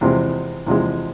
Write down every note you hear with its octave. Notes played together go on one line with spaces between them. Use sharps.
E2 C3 F3 G#3
E2 C3 F3 G#3